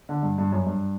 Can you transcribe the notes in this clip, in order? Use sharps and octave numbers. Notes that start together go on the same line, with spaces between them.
D3
G2
G2
F#2
G2